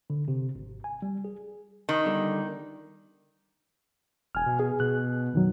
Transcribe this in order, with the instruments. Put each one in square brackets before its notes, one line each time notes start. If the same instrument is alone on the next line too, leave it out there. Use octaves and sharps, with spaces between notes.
[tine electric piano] D3
C3
G#1
G#5
G3
G#4
[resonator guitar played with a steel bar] D#3
[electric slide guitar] D3 G3
[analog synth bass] E1 [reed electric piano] G#5 F6
[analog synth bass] B2
[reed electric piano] G#4
[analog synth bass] B2 [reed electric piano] F#6
[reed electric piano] F#2 D#3 F#3